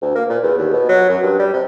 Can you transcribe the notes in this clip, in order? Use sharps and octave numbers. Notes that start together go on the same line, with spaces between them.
D2
A#3
A#2
E2
D#2
B2
F#3
F#2
G2
G3
C3